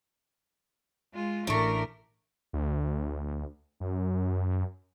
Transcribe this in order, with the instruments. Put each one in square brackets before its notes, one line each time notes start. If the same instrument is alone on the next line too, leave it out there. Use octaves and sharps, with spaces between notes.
[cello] G#3 F4
[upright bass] A1 [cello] A3 A#4 [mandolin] D4 C#6
[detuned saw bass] D2
F#2